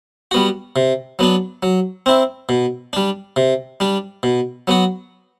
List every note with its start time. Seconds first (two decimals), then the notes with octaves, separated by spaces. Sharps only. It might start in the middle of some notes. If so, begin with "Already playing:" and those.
0.31 G3 B3 F#4
0.76 C3
1.19 F#3 B3 D4
1.63 F#3
2.06 C4 E4
2.49 B2
2.93 G3 D4
3.36 C3
3.80 G3 D4
4.23 B2
4.67 F#3 B3 F#4